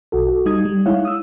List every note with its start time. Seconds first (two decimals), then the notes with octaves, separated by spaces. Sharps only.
0.12 B1 F#4 A4
0.28 F#4 A4
0.46 G3 D#4 D#6 G#6
0.65 G3
0.86 G#3 D#4 E4 C#5 F5 F#5
1.05 D#6 E6